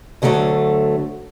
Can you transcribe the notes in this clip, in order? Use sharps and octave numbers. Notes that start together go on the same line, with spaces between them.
D2 D3 F#3 G3 A3